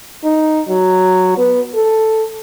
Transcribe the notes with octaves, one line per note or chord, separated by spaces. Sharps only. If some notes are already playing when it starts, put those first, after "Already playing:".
D#4
F#3
B3
A4